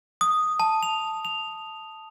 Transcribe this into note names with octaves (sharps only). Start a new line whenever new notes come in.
D#6
A5
F7
F7